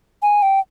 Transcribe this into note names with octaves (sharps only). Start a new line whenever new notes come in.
G#5
G5